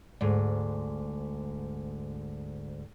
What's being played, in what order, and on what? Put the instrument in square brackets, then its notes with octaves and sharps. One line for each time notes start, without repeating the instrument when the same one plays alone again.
[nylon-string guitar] D2 G#2